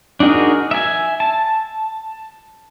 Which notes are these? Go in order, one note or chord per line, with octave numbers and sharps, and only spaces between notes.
D4 D#4 F#4 G#4 A#4
E5 G#5
A5